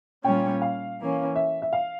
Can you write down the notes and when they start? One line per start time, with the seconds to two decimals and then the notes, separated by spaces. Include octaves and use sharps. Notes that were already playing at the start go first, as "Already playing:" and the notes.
0.24 A#2 G3 C#4 F4 C#5 G5
0.62 F5
0.99 E3 A#3 C#4
1.36 E5
1.62 E5
1.73 F5